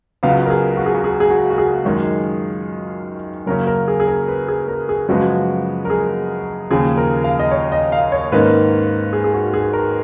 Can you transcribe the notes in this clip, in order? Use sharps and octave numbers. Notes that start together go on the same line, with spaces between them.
C#2 C#3 F#3 B3 F5
A#4
G#4
F#4
G#4
F#4
G#4
G#4
F#4
F#4
G#4
F#2 D#3 G#3 C#4
F#2 C#3 F#3 A#3 C#4 A#4
A#4
G#4
G#4
A#4
B4
G#4
A#4
G#4
F#2 C#3 F3 G#3 B3 F#4
A#4
G#4
D#2 C#3 F3 G#4
A#4
F5
D#5
C#5
D#5
F5
C#5
G#2 D#3 A#3 C#4 B4
G#4
G#4
F#4
G#4
A#4